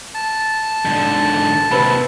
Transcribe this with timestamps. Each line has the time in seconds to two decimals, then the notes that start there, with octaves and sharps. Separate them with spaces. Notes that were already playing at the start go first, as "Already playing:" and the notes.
0.14 A5
0.85 G#2 D3
1.72 D#2 C3 B4 C5 B5